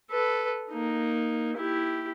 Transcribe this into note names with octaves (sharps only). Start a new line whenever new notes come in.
A4 B4
A#3 D#4
E4 G4